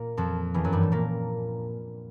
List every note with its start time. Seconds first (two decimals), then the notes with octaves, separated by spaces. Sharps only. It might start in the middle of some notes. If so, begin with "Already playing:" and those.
Already playing: A#2 A#3
0.17 F2 F3
0.54 E2 E3
0.64 F#2 F#3
0.72 G2 G3
0.82 A2 A3
0.92 A#2 A#3